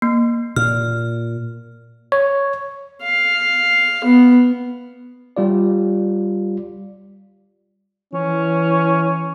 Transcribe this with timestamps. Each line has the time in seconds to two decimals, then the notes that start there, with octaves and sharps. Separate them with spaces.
0.02 A#3
0.56 A#2 F6
2.12 C#5
3.03 F5
4.04 B3
5.37 G3 F4 D5
8.13 E3 C#4